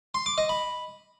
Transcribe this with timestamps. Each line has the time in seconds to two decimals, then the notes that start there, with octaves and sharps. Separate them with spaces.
0.14 C6
0.26 D6
0.38 D#5
0.49 B5